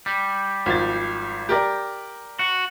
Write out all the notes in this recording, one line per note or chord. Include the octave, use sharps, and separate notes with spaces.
G3
G#1 F3 A6
G4 A#4 D5
F#4